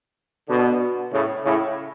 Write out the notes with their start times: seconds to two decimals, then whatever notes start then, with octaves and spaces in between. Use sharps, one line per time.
0.48 B2 D3
1.12 A2 C#3
1.44 A2 C#3